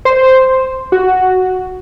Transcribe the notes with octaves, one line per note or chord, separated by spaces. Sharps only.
C5
F#4